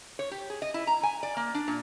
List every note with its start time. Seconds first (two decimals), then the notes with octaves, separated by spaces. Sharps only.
0.19 C#5
0.31 G4
0.50 G#4
0.62 D#5
0.74 E4
0.87 A#5
1.03 G#5
1.23 D5
1.37 A#3
1.55 D4
1.68 A#2